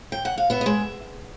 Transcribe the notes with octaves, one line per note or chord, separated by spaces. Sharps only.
G5
F#5
F5
B3 E5
D#5
G#3 E5